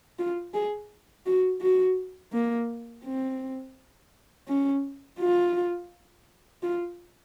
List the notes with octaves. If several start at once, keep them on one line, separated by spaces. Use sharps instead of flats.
F4
G#4
F#4
F#4
A#3
C4
C#4
F4
F4